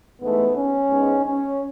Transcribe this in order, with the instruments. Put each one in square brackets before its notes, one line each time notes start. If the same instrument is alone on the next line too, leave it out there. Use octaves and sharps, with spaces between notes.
[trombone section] G#2 E3 A3 B3
C#4
G#2 G#3 B3
C#4